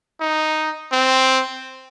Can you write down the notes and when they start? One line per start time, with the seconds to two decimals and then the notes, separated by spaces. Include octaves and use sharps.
0.21 D#4
0.92 C4